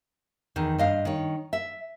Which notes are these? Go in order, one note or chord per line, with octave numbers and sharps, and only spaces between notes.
E2 D#3
G2 D#5 F5
D#3 C#5
E5